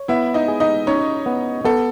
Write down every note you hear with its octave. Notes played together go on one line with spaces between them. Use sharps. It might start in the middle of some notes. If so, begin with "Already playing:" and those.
Already playing: C#5
B3 E4 E5
D#4 D#5
G#4
D#4 D#5
C#4 D#4 C#5
B3
B3 A4